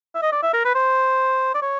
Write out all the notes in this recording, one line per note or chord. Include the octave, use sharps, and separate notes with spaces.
E5
D#5
D5
E5
A#4
B4
C5
D5
C#5